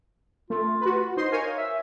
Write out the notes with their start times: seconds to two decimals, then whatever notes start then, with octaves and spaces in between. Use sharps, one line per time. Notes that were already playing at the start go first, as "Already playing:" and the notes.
0.50 A3 F4
0.81 F#4 B4
1.17 D#4 C5 D#5 C6
1.32 A#4 C#5 F5 G#5
1.58 E5